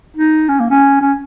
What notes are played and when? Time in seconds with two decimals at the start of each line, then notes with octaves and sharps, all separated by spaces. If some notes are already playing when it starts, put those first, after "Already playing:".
0.17 D#4
0.49 C#4
0.60 A#3
0.71 C#4
1.01 C#4